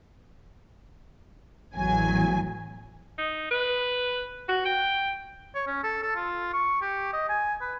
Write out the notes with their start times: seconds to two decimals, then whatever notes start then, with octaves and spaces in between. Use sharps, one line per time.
1.75 A1 E2 F#3 G#5
3.18 D#4
3.51 B4
4.49 F#4
4.66 G5
5.55 C#5
5.67 C#4
5.84 A4
6.03 A4
6.16 F4
6.54 C#6
6.82 G4
7.13 D#5
7.29 G#5
7.61 B4